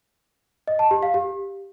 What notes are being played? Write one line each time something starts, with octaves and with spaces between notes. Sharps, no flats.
D#5
A5
G4
F5
G4